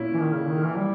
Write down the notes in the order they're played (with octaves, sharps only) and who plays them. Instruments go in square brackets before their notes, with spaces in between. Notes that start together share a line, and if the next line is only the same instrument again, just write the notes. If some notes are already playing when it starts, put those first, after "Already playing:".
Already playing: [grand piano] A#2 C#4 E4
[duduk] E3
D#3
C#3
D#3
E3
G3